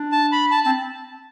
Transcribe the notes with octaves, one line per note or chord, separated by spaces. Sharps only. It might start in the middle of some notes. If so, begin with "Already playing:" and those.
Already playing: D4
A5
B5
A5
C4 A5